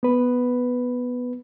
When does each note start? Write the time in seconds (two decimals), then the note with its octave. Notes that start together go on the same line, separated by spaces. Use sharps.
0.03 B3 B4